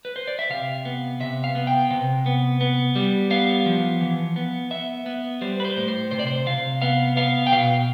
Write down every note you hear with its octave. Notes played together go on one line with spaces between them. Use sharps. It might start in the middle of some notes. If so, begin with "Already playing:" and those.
B4
C5
D5
E5
C3 F5
B3
C3 E5
F5
B3
G5
C3
B3
B3
G3
B3 F5
F3
E3
B3
B3 E5
B3
G3 C5
B4
C5
A2
C5
C3 C5
D5
C5
C3 F5
B3 F5
B3 F5
G5
B2 F5